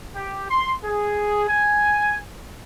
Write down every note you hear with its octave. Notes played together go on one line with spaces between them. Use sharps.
G4
C6
G#4
G#5